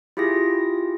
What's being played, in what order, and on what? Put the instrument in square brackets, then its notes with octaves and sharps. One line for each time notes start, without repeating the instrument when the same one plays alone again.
[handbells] E4 F4 G4 G#4 A#6